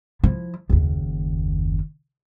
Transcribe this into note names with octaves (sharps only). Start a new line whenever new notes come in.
F3 E4
F#1 D#2